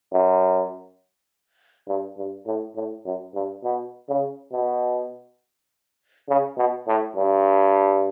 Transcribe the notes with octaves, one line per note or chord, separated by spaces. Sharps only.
F#2
G2
G2
A2
A2
F#2
G2
B2
C#3
B2
C#3
B2
A2
G2